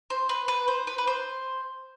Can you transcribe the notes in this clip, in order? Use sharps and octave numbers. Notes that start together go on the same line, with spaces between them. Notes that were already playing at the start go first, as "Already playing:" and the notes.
C5
B4
B4
C5
B4
B4
C5